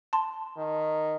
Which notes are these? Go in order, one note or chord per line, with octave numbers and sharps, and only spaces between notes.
A5 C6
D#3